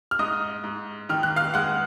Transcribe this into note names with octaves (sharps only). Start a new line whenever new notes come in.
F6
G#2 D#5 D#6
G#2
D#3 F6
F#6
F5 F6
G#3 F#5 F#6